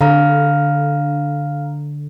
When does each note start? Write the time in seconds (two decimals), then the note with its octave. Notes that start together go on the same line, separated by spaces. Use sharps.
0.01 D3 F5 A#5 F6